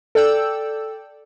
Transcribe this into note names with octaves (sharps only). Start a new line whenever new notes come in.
A4 D5 G5 E6